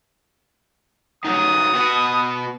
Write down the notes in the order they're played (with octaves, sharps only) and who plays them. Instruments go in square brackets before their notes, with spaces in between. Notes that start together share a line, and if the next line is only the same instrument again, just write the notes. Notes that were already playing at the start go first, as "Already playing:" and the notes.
[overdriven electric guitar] D#3 F#3 [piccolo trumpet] D#6
[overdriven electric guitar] B2 F#4